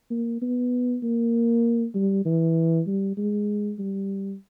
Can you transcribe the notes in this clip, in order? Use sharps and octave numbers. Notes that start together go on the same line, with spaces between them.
A#3
B3
A#3
G3
E3
G3
G#3
G3